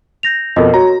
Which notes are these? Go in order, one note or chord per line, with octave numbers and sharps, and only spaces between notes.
G6 A#6 F7
F2 B2 A4 A#4 D#5
F#4 C#5 A#5